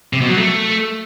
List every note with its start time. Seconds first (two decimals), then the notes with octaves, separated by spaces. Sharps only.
0.13 C3
0.21 B2
0.29 F#3
0.37 A3